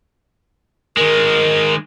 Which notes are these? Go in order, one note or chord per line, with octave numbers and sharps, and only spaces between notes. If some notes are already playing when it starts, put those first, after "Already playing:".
D#3 G#3 A#4